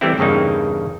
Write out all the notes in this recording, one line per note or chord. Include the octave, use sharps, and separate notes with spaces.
E3 G3 A3 C4 E4
E2 G2 C#3 A#3 D#4